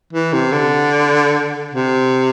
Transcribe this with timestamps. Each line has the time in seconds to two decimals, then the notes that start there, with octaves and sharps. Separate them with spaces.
0.13 E3
0.33 C3
0.53 D3
1.74 C3